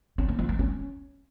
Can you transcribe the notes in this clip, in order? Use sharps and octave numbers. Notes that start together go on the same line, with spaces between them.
C#4
A#3
F3
A#3
C#4